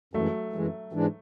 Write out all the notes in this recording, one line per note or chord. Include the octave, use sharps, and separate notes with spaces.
F#2 E3 F#3 G#3 A3
F#2 E3 G#3
G#2 E3 G#3 D4